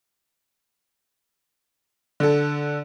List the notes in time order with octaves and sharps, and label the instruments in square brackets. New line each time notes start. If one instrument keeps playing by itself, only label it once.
[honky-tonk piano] D3 A4